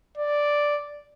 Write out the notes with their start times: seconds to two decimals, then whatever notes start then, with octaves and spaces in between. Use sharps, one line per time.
0.17 D5